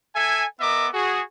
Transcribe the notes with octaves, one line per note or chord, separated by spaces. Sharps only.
A4 E5 G#5
B3 A#4 D#5 E5 D6
F#4 G#4